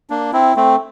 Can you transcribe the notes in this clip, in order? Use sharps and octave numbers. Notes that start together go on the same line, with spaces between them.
A#3 D4
C4 E4
A3 C4